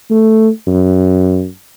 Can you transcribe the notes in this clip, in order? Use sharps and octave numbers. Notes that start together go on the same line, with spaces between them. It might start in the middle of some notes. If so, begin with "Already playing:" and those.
A3
F#2